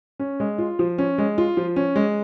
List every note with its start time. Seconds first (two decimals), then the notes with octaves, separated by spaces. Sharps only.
0.19 C#4
0.40 G#3
0.58 F4
0.79 F3
0.98 C#4
1.18 G#3
1.38 F4
1.57 F3
1.76 C#4
1.96 G#3